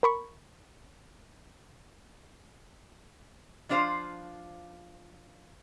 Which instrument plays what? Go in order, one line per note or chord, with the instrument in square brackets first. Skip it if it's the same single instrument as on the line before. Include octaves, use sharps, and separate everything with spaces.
[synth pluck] A#4 B5 C#6
[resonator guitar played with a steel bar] F3 D4 F4 C5 F5